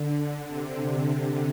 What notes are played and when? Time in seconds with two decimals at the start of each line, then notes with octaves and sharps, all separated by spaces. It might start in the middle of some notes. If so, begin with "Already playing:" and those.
Already playing: D3
0.47 C3